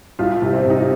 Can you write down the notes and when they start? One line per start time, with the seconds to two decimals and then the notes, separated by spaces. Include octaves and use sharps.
0.19 C2 F4
0.42 C3
0.53 C4
0.66 C3 D#4